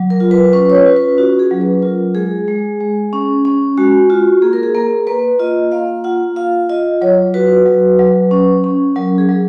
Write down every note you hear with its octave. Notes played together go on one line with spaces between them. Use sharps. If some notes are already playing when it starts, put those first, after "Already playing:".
Already playing: F#3
A#4
F4
B4
C#4 B4
C#5
B4
F4
B4
C#4 F#4
G#4
F#3
B4
F4 A#4
G#3 G#4
G#3
G#3
C#4
C#4
G#3 F#4
F4 F#4
A#3 G#4
A#4
G#4
A#3 A#4
A#3 B4
F4 D#5
A#3 F5
F4 F#5
F4 F5
F4 D#5
F#3 C#5
F#4 B4
F#3
F#3
C#4
C#4
F#3 A#4
G#4
F#3